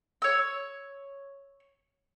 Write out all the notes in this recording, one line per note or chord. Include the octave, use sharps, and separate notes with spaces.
C#5 E6